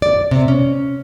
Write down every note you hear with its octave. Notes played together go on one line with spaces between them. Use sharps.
D5
C3
C#4